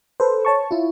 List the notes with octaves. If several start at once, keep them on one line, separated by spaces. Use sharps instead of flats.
A4 B4 C5
C#5 A5 C#6
E4 F4